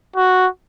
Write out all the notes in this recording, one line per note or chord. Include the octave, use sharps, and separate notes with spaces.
F#4